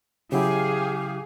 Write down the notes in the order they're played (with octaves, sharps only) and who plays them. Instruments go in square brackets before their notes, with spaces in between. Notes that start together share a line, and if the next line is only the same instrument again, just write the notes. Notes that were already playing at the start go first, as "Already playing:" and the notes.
[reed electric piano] C#3 F#3 E4 [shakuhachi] G4 [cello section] G#4 F5